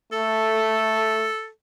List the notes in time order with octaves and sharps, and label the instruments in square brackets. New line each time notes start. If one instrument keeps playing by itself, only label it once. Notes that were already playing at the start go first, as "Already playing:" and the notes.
[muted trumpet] A3 [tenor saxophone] A4